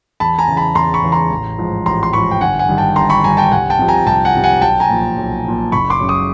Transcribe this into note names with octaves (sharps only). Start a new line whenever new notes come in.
E2 A5 B5
G#5 A#5
C#3 E3
A5 B5
E2 A#5 C6
B5 C#6
C#3 E3
A#5 C6
A1
G#2 F3
A1 A#5 C6
C6
G#2 F3 B5 C#6
G5
G1 F#5 G#5
F#5 G#5
G2 D#3
G5 A5
G1 A#5 C6
B5 C#6
G2 D#3 G#5 A#5
G5 A5
C2 F#5 G#5
G5 A5
C3 F3
G#5 A#5
C2 G5 A5
F#5 G#5
C3 F3
F#5 G#5
B1 G5 A5
G#5 A#5
A#2 F3
B1
A#2 F3
F#1 B5 C#6
C6 D6
F#2 C#3
C#6 D#6